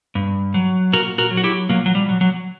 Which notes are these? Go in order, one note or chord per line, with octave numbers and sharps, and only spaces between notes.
G2
F#3
A#2 F#4 A#4
F#4 A#4
F#3
F#4
E4 G4
A#2 F#3 A#3
F#3
G3
F#3
F#3